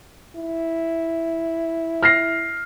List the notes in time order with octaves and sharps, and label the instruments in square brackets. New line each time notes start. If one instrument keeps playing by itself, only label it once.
[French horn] E4
[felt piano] F6 A#6 C7